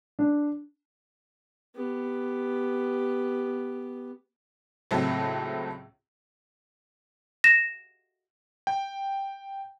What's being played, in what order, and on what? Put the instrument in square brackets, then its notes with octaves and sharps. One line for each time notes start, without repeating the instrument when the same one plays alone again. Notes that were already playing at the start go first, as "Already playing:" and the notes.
[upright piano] D4
[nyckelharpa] B3 G4
[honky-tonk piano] C#2 A2 F#3 A3 C4
[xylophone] A#6 E7
[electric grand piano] G5